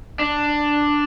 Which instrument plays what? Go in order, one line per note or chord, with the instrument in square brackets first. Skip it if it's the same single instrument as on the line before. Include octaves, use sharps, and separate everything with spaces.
[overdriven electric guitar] D4